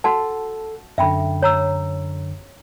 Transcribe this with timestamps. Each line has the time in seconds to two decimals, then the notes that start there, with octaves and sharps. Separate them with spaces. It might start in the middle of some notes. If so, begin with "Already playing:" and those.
0.04 F#4 A4 F#5 A5
0.98 F#2 D3 E5 G5 B5
1.42 C#5 A#5 E6